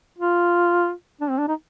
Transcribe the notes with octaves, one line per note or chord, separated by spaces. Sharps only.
F4
D4
C4
D4
D#4